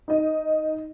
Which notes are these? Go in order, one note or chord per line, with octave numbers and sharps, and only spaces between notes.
D#4 D#5